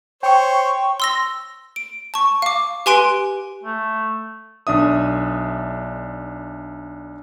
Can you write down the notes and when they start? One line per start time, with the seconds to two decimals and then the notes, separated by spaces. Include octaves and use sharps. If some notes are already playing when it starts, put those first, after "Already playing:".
0.23 C5 C#5 G5 C#6
1.00 C6 E6 A#6
1.76 D7
2.14 A5 C#6
2.42 F5 D6
2.86 G4 B4 G#5 C6 F#6 D7
3.63 A3
4.67 B1 D4 E5 D#6